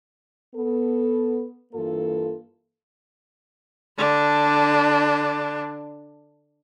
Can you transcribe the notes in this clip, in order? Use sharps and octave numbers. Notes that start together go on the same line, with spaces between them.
B3 A4
G2 E3 A#3 F4 A4
D3 D4